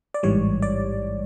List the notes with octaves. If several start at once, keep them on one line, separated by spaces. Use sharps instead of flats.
D5
A1 G#2 E3 G3 C#5
D5